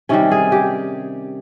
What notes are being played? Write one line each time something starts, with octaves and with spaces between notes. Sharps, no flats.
C3 D#3 G3 C#4
G#4
G4